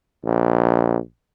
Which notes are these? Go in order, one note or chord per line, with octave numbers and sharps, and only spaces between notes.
A#1